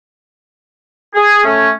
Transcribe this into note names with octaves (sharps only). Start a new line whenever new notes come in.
G#4
A3 C#4